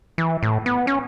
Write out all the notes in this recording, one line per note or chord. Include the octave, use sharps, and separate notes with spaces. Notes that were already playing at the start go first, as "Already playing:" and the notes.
E3
A2
B3
C#4